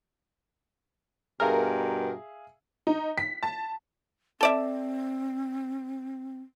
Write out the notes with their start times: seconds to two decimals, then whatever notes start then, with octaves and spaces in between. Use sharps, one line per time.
1.40 G2 B2 G#4 A#4 E5 F5
2.87 D#4
3.18 B6
3.43 A5
4.41 C4 A4 D5 E5